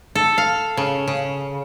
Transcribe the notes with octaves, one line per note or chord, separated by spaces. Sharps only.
A4
F5
C#3
C#3